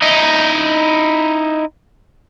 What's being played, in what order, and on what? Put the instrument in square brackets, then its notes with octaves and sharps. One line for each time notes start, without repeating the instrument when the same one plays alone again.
[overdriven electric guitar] D#4 E4